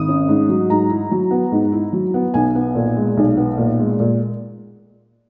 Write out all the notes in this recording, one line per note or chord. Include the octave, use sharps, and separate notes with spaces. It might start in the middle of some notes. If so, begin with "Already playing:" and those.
Already playing: G#1 D#6
C#4
G#2
F#3
G#2 A#5
E4
F#3
B3
G#2
E4
F#3
B3
B1 G#5
B3
A#2
G#3
B1
B3
A#2
G#3
A#2